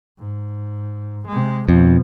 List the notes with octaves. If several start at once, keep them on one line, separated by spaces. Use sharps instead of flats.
G#2
C3 G#3
F2 B2 F3